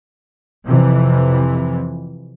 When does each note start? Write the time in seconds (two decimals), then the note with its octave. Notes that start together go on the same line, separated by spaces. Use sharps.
0.66 F2 C3 E3